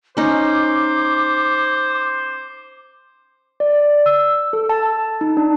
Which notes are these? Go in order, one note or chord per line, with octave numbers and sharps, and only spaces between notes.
C#4 D#4 C5 D6
D5
E6
A4
A5
D#4
D4